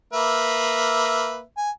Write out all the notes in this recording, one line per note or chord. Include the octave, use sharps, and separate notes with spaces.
A#3 B4 E5
G#5